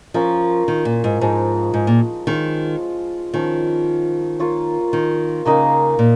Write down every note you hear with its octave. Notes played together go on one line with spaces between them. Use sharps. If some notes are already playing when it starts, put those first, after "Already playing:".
F3 C#4 F4 A#4 F5
D#3
A#2
G#2
G#2 F3 G#3 D#4
G#2
A#2
D#3 G#3 F4 C#5 F5
D#3 F3 C#4 F4
A#3 F4 C#5
D#3
C#3 A#3 D#4 A#4 F5
A#2